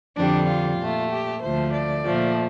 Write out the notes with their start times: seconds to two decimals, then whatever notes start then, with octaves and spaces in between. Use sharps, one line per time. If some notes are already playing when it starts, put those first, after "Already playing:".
0.17 F2 D3 G3 D4
0.48 F4
0.79 A#2 A3
1.11 G4
1.42 D2 D3 F3 A3 C5
1.74 D5
2.06 A#2 F3 A3